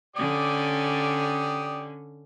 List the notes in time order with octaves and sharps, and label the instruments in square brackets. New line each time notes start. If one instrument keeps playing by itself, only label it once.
[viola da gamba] D3 C#4 [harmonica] G4 D5 D#6